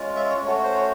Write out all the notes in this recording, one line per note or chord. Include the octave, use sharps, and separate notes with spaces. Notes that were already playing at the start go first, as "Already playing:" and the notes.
Already playing: G#3 C#4 F4
E5
C#5
A3 C#4 F#4 C#5
C5
C#5